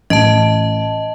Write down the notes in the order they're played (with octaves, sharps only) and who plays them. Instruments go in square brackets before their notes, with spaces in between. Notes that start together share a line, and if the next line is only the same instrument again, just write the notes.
[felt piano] A1 D7 [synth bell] D#5 A5